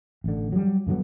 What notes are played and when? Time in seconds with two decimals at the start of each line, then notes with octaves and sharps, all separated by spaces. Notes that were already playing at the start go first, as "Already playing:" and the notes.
0.24 A1 D3
0.52 F#3 G3
0.87 G2 D3 F#3 B3